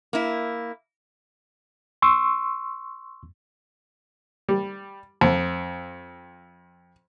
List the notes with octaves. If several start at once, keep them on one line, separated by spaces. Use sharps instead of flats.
A#3 E4
C6 C#6 E6
G3
F2